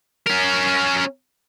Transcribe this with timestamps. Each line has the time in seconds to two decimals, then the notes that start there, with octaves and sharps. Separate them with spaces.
0.27 C#4 A#4